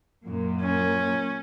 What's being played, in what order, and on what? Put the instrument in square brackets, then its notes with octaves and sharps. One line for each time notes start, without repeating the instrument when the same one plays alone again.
[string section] F#2 A#2
[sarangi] C#4